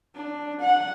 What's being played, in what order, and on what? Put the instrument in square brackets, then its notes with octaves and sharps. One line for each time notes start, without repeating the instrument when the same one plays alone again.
[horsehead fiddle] D4
F#5